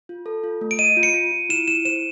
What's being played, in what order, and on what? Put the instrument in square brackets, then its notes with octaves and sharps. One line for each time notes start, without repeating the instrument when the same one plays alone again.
[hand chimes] F4
A4
F4
A3
[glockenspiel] D7
[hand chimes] D#5 [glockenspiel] D#7
[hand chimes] F4
[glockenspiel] C#7
[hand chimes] F4
F4
[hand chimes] E4 [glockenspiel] E7
[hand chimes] E4 [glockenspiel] E7
[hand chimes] C5 [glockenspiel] E7